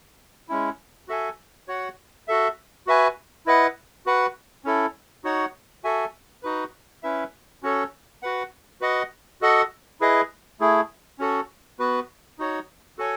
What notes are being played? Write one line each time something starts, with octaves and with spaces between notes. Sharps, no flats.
G#3 C#4 E4
F#4 A4 E5 G#5
F#4 C#5 F#5
F#4 A4 E5
F#4 B4 E5 G#5
E4 B4 D#5 F#5
F#4 B4 F#5
C#4 E4 A4
D#4 F#4 C#5 F#5
F#4 A4 E5 G#5
D#4 F#4 B4
C#4 E4 B4 E5
C#4 F#4 A4 C#5
F#4 B4 F#5
F#4 B4 D#5 F#5
F#4 A4 D#5 F#5
E4 G#4 B4 D#5
A3 E4 G#4
C#4 F#4 A4
B3 F#4 B4
D#4 F#4 C#5
F#4 A4 C#5 G#5